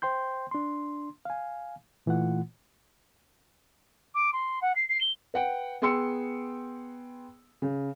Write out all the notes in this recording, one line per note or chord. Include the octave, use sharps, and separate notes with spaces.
C5 G5 C6 G6
D4 C6
F5 G#5
A#2 E3 A3 F4 F#5
D6
C6
F#5
C7
C7
G7
B4 F#5 G5
B3 G#4 G5 C6 E6 C#7
C#3